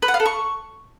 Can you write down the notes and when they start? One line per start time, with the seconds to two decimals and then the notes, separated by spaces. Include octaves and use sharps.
0.02 B4
0.08 F#5
0.14 F5
0.20 A4
0.26 C#6